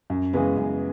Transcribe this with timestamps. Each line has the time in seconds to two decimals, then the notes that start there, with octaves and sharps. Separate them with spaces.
0.10 F#2
0.33 C#3 E3 G#3 B3
0.57 F#2